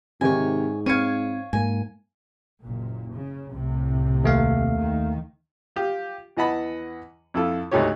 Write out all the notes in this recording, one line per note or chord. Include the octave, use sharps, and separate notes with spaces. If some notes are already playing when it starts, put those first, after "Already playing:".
G#2 C3 D#3 G4 C#5 G#5
C4 C#5 F5 G#6 C#7 D#7
G#2 A#3 G#5
F#1 A#2
C#3
C2 A2 C3
D#2 A3 F5
D#3
F4 G4
E2 E3 D#5 F#5 A5 B5
F2 E4 F4 A4
D2 G#2 A3 D#4 G4 C#5